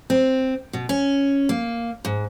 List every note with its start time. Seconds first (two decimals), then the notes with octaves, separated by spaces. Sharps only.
0.10 C4
0.73 B2
0.89 C#4
1.49 A#3
2.05 G#2